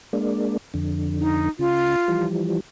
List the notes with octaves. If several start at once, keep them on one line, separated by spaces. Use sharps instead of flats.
G#3 A#3 D4
F2 D3
D#4
C#3 F4
E3 F3 G3